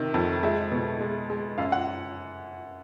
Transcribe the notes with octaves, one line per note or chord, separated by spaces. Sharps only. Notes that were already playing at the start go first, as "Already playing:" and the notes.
Already playing: C3 D#3
F2
G#3 E5
B2
G#3
G#3
F#2 F5
F#5